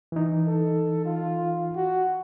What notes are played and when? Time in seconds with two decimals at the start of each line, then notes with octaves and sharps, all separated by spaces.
0.12 E3 D#4
0.47 A4
1.05 F4
1.76 F#4